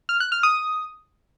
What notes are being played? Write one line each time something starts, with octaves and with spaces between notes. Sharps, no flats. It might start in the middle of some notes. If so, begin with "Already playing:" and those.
F6
F#6
F6
D#6